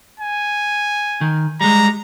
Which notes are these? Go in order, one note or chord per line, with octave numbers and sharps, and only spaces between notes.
G#5
D#3
G3 G#3 A#5